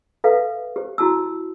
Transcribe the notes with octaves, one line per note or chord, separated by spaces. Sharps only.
A4 B4 E5 F5
G4 C5
E4 F#4 A5 E6